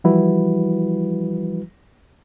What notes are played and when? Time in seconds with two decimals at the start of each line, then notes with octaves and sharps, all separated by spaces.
0.04 E3 F3 G3 E4 F#4 B4